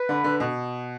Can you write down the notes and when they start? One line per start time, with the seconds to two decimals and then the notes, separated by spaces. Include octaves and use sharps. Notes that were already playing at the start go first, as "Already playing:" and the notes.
Already playing: B4
0.09 D3
0.24 D3
0.40 B2